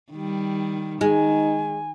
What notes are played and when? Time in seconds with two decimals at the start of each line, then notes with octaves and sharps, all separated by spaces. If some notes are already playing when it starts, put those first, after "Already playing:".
0.12 D#3 G3
1.01 D#3 G#3 D#4 G#5